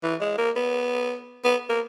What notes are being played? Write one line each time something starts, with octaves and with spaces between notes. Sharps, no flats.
E3
G#3
A#3
B3
B3
A#3